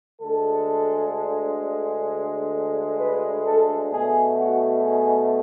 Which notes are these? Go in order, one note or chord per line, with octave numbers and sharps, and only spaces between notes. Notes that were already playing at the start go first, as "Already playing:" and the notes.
D2 D3 G#3 A4
B4
A4
B2 A3 G#4
F#4
G#4